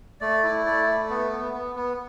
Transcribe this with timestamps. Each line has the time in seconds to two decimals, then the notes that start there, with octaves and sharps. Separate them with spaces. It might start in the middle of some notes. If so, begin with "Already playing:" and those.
0.21 A3 D5
0.43 E4
0.66 A3 D5
0.87 A3
1.09 B3
1.32 B3
1.54 B3
1.76 B3